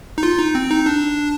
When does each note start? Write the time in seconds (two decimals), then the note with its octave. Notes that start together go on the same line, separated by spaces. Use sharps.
0.18 D#4
0.23 F4
0.38 D#4
0.55 C4
0.70 D#4
0.86 D4